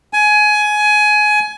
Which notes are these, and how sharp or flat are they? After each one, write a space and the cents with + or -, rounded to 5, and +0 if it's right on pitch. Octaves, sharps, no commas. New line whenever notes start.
G#5 +20